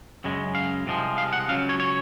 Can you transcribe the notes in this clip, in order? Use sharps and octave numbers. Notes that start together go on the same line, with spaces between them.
F#2 C#3 G#3
F5
C2 C3 F3 G#3
F5
F#5
C#2 C#3 F#3 F5
C#5
C#5